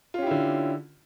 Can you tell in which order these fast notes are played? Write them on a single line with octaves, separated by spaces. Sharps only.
F4 C#4 G4 E4 D3